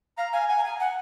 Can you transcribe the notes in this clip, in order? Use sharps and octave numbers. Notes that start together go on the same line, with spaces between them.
F5 A#5
F5 G#5
F#5 G#5
A#5
G#5
F#5